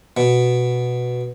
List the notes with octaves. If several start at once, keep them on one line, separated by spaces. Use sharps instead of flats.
B2